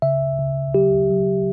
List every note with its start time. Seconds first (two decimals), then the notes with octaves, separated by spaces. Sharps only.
0.02 C#3 E5
0.39 C#3
0.74 F#3 G4
1.10 F#3